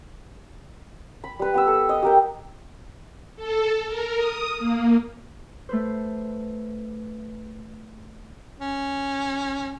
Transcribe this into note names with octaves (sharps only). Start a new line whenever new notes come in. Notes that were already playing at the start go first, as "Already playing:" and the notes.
B5
G3 B4
B3 G4 E6
A4
D#5
G4 A#4 G5
A4
A#4
D#6
A#3
A3 B4 C5
C#4